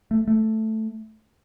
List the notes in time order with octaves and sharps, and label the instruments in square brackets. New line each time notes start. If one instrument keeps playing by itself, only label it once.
[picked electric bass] A3
A3